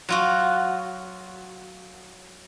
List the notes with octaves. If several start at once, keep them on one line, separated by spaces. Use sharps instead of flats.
F#3 F4 F#4